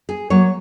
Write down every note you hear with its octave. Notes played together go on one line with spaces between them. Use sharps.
G#4
F#3 A#3 C#5